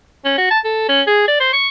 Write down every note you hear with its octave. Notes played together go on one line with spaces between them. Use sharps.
C#4
F#4
A5
A4
C#4
G#4
D5
C5
C#6